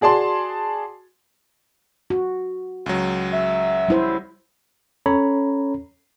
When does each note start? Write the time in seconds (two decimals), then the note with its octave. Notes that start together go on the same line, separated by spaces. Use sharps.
0.01 F#4 G#4 D5 A5 C6
2.10 F#4
2.86 C#2 F#3
3.33 E5
3.88 G3 E4 C5
5.06 C#4 A4 C#5 A#5 B5